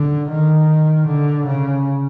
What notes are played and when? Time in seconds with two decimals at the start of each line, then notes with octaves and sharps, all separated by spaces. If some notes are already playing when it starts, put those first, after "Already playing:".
Already playing: D3
0.29 D#3
1.07 D3
1.46 C#3